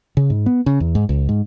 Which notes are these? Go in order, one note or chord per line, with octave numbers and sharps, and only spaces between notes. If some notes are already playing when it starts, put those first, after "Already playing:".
C#3
G#2
B3
C#3
E2
G#2
C#2
G#2